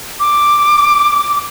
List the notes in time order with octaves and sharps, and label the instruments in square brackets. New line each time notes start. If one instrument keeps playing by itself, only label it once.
[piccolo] D6